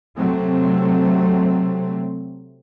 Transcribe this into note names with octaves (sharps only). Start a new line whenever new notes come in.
C3 F#3 A3 C4